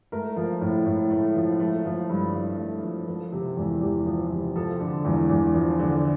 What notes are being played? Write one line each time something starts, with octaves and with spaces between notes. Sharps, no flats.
A3 A#4
F3
A2
A2
A3
F3
A3
F3
G2
G2
A3
F3
F3 A4
C3
E2
E2 G4
F3
C3
F3 A4
D3
E2
E2
F3
D3